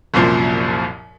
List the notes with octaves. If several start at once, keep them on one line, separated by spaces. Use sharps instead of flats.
C2 F#2 A#2 F3